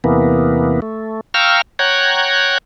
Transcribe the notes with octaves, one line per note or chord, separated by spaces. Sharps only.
E2 C3 E3 A#3 B3
A3
F5 G5 A#5 C#6 E6 F6
C#5 F#5 G5 A#5 F#6 G#6